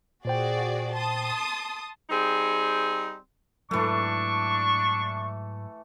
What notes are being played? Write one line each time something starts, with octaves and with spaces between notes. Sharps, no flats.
A#2 F#4 G#4 C5 D5 G5
A5 C6 D#6
G3 C4 D#4 G#4
G#2 E3 F#3 A3 D4 C#6